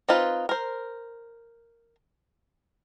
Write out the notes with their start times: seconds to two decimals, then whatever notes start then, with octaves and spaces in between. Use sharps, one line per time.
0.09 C4 D#4 F4 B4
0.49 A#4 C5